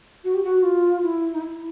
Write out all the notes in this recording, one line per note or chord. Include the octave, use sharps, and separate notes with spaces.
F#4
G4
F#4
F4
E4
D#4
E4